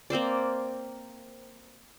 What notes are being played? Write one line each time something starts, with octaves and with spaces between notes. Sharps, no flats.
A#3 C4 C5 D5